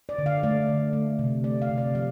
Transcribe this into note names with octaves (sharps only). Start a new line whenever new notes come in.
D5
D3
F5
A3 D5
D3
A3
C3
A3 D5
F5
C3
D5
F3 F5